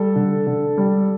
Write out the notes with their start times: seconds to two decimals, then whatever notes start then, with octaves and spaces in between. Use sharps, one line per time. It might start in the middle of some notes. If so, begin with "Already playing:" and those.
Already playing: G3 A4
0.16 D3
0.47 D3
0.78 G3